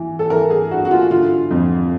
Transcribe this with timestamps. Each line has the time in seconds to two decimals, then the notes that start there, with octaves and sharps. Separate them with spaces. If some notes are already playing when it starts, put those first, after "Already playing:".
Already playing: E3
0.19 A4
0.30 E3 A#4
0.50 G#4
0.71 G2 F#4
0.85 F#4
0.91 F4
1.11 D3 F4
1.51 F2